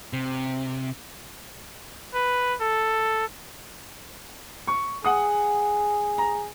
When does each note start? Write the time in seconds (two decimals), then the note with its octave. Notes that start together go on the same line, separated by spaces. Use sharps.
0.13 C3
2.14 B4
2.61 A4
4.67 C#6
5.04 G#4 F#5 D#6
6.18 A#5